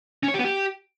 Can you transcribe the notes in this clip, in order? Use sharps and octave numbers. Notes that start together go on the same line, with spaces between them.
C#4
C#5
G4
B3
G4